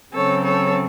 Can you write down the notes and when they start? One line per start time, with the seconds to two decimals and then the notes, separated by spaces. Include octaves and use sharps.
0.14 C#3 F#3 C4 A4 C#5
0.45 A4 C#5